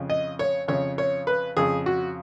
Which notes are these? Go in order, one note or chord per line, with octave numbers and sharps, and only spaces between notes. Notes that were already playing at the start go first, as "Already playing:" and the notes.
Already playing: F2 C#3
D#5
C#5
F2 C#3 C#5
C#5
B4
F2 C#3 G#4
F#4